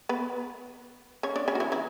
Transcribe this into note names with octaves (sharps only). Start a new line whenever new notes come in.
B3 B4
C#4 C#5
D4 D5
C#4 C#5
F#4
E3 E4
E3 E4